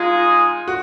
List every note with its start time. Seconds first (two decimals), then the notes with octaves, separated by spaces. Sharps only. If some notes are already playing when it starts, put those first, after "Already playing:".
Already playing: G#3 D#4 F4 G#4
0.68 F#4